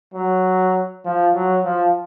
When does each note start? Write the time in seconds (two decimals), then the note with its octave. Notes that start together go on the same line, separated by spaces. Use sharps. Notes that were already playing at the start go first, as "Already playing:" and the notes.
0.14 F#3
1.05 F3
1.34 F#3
1.64 F3